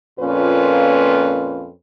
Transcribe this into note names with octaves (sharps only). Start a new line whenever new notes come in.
F2 A#2 A#3 C#4 F4 B4